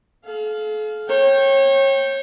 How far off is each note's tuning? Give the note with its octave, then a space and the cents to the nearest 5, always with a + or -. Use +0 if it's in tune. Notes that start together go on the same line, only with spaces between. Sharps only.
A4 -45 F5 +0
C#5 -30 G5 +0